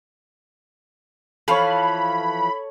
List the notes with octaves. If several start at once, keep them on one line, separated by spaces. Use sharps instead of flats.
E3 F3 A4 C#5 F5 B5